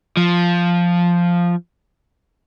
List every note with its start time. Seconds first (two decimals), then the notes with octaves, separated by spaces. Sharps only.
0.17 F3